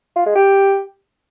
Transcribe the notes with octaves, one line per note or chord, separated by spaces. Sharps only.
F4
G#3
G4